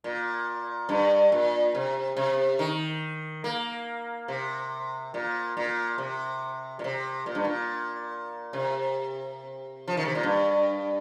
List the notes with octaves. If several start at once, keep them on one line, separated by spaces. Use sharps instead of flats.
A#2
G2
A#2
C3
C3
D#3
A#3
C3
A#2
A#2
C3
A#2
C3
A#2
G2
A#2
C3
F3
D#3
C3
A#2
G2